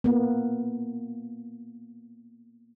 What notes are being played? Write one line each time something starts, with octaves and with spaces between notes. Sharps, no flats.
A#3 B3